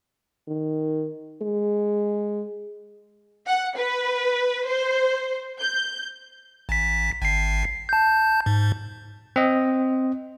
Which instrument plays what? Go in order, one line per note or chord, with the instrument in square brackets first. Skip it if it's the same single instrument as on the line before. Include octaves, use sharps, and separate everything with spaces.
[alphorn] D#3
G#3
[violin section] F#5
B4
C5
G6
[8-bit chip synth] A1 B6
G#1 C7
A5 G6
G#2
[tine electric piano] C4 D#5